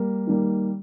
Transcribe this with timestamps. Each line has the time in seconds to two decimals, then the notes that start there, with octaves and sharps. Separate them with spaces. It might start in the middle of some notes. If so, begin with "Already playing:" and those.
Already playing: G3 A#3
0.27 D#3 G3 A#3